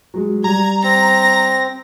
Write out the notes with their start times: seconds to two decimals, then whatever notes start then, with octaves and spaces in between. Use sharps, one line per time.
0.14 F#3 G#3
0.44 G3 A#5 G#6
0.83 C4 A#6